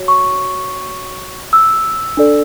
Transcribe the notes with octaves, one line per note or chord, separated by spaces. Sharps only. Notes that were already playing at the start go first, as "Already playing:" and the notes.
Already playing: F#4 C#5
C#6
E6
D4 A4 D5